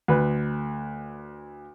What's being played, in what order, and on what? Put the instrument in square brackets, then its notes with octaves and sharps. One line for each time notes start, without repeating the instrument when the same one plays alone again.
[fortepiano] D2 B4